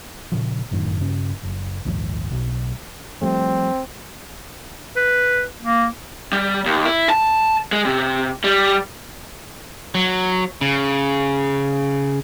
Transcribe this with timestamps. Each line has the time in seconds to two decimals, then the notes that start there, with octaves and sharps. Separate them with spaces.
0.32 A#2 C#3 F3
0.71 G1 F#2 A2 D#3
1.00 G2 C#3 C#4
1.43 F#1
1.85 A#1 D#2 G#2 F3
2.31 B1
3.22 F3 G3 A3 C4
4.96 B4
5.62 A#3
6.33 G3
6.66 D#2
6.86 E4
7.10 A5
7.72 G#3
7.85 C3
8.44 G3
9.95 F#3
10.61 C#3